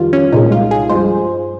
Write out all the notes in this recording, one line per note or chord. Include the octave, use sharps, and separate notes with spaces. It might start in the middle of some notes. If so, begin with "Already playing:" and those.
Already playing: F2 D#3 G3 F4
C#4
C2 A#2 G#3 D#4
F4
G#4
G2 F3 G#3 C5